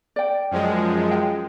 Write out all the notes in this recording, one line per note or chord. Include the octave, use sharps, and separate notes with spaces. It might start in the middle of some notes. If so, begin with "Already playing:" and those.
D5 G5
F#2 F3 G#3
G5